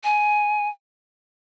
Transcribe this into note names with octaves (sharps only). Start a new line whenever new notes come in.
G#5